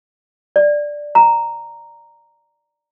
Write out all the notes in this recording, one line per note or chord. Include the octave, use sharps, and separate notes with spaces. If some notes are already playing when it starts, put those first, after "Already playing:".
D5
A#5